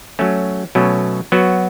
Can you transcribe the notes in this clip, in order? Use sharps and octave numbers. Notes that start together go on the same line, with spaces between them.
F#3 A3 C#4
B2 F#3 A3 C#4
F#3 B3 F#4